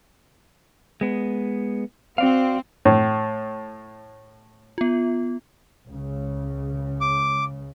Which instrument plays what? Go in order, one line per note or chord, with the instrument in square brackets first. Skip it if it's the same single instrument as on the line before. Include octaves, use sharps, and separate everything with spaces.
[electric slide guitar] G#3 B3
[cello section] C4 [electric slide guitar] F#4 D5 F5
[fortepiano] A2
[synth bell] B3 F4
[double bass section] C#2 C#3
[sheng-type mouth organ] D6